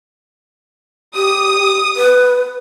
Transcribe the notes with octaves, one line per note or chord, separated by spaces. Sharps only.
G4 D#6
B4